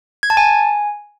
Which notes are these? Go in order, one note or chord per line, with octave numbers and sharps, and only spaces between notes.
G#6
A5
G#5